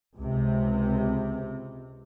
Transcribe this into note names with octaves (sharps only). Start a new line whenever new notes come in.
C#2 C3